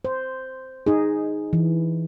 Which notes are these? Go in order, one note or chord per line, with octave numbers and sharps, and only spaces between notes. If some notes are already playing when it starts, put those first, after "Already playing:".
C5
D#4 G#4
E3